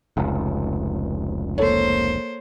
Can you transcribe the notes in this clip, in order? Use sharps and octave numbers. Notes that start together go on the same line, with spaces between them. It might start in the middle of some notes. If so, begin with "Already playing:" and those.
F1 C#2
A#3 A4 C5 C#5